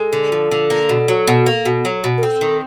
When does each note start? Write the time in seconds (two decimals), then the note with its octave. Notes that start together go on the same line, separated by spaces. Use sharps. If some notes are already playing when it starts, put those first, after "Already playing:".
Already playing: G#3 A4
0.13 D3
0.32 F3
0.51 D3
0.70 A#3
0.89 B2
1.08 F#3
1.27 B2
1.46 A#3
1.65 B2
1.85 F#3
2.04 B2
2.18 A#4
2.23 C4 A4
2.41 D#3